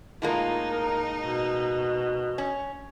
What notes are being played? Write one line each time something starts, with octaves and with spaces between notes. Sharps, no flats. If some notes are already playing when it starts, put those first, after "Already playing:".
A2 G#3 A#3 D#4 F4
A#4
B2
C#4